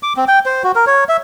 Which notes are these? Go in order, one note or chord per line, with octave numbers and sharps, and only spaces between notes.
D6
C4
G5
C5
F#4
A#4
C#5
E5